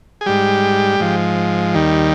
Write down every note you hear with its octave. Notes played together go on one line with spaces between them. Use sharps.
G#4
G#2 G3 G4
G#2 F3
D#2 D#3 G3